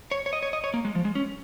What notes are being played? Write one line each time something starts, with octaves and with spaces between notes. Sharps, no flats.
C#5
C#5
D#5
C#5
D#5
C#5
A#3
G#3
F3
G#3
C#4